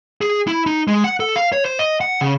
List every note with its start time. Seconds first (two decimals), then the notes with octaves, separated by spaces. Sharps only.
0.21 G#4
0.47 E4
0.66 D#4
0.88 G#3
1.04 F#5
1.20 A4
1.36 F5
1.52 C#5
1.65 C5
1.79 D#5
2.01 F#5
2.21 C#3